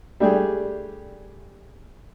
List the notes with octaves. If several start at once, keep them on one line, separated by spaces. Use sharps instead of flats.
G3 A3 D4 G4 G#4